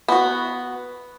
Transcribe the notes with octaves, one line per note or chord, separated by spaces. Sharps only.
B3 F#4